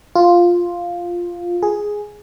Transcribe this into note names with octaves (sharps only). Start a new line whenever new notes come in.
F4
G#4